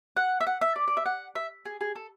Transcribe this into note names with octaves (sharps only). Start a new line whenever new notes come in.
F#5
E5
F#5
E5
D5
D5
E5
F#5
E5
G#4
G#4
A4